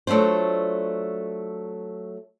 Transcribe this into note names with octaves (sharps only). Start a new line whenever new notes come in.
F#3 A3 D4 F4 C5